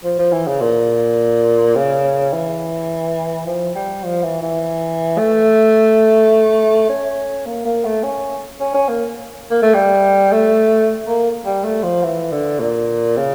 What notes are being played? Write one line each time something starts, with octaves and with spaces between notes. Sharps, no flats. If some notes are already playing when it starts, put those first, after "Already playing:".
F3
F3
E3
C#3
A#2
C#3
E3
F3
G3
F3
E3
E3
A3
C#4
A#3
A#3
A3
C#4
C#4
C#4
A#3
A#3
A3
G3
A3
A#3
G3
A3
F3
E3
D3
A#2
C#3